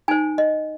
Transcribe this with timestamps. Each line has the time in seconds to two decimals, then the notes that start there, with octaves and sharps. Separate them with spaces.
0.08 D#4 C5 G#5
0.38 D#5